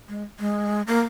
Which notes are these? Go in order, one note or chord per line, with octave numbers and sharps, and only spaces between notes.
G#3
G#3
A#3